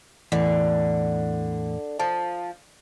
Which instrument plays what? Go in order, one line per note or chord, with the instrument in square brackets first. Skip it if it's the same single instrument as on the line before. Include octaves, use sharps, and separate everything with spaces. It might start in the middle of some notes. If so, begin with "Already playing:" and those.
[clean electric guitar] E2 A2 E3 [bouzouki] D3
[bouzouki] F3 [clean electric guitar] A5